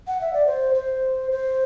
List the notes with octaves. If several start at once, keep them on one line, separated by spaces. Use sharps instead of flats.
F#5
E5
D5
C5
C5
C5